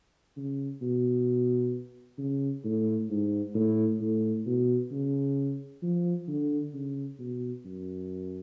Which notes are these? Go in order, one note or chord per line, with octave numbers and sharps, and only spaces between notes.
C#3
B2
C#3
A2
G#2
A2
A2
B2
C#3
F3
D3
C#3
B2
F#2